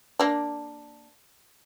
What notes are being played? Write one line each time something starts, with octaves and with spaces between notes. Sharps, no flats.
A#3 D4